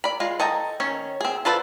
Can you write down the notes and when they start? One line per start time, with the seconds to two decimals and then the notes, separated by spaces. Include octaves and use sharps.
0.04 D5 B5
0.20 G#3 F4
0.40 A4 D#5 G5 G#5 A#5
0.80 D#3 C#4 C#5
1.21 C4 G#4
1.45 F4 A4 B4 C5 D5